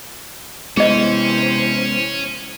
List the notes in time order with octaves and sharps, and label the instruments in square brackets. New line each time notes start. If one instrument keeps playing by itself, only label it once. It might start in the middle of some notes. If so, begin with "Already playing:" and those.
[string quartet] C3 E3 C5 [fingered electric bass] G#3 B3 [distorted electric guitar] C#4 [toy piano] G#4 D#5